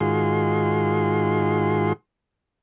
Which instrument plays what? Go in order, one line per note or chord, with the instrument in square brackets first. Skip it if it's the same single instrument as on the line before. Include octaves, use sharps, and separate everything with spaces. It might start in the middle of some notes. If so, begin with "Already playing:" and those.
[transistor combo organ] G#2 D#3 F4 F#4 G#4 C6